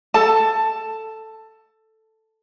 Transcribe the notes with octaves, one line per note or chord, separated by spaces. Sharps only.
A4 A5